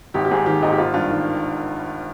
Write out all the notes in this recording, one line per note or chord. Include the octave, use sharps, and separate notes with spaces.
G#1 G4
G4
G#2 G#4
D#3 G4
G#1 D#4
G4
G#1 F4
G2 F4
D#3